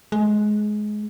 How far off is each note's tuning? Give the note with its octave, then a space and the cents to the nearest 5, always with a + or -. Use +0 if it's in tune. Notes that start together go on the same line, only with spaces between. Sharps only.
G#3 +20